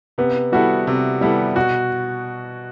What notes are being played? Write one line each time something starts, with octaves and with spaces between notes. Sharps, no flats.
C3 B3
G3 B3 E4 F#4 A4
C3
G3 B3 E4 A4
B2 F#4